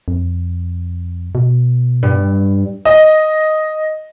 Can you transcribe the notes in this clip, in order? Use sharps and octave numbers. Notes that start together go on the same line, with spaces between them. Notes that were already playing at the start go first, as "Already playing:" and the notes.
F2
B2
G2
D#5